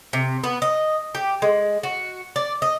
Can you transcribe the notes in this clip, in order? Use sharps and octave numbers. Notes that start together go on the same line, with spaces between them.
C3
B3
D#5
G4
G#3
F#4
D5
D#5